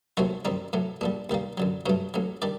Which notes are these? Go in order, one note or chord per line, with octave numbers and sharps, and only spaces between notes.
D#2 D#3 F#3 A3 C4 F#4
F#2 D#3 G3 C4 D#4
A2 F#3 A3
A#1 A#2 G3 D4
D#2 D#3 G3 A#3
F#2 D3 F#3
G2 F#3 A3 F#4
A1 A2 F#3
D#3 G3 D4 D5